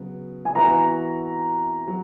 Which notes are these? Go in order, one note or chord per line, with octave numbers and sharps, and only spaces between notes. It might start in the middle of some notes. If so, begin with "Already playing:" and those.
Already playing: C#3 F#3 B3
G#5
E3 B3 F#4 B4 E5 A#5
F#3